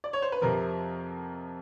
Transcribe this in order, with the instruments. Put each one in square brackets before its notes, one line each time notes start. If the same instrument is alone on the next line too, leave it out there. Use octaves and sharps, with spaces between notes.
[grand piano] D5
C#5
C5
B4
F2 C3 F3 A#4